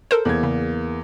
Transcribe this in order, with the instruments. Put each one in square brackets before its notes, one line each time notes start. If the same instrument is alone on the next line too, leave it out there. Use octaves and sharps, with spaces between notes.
[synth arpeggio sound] A4 A#4 C5
[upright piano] E2 A#3 G#6
[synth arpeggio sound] C#3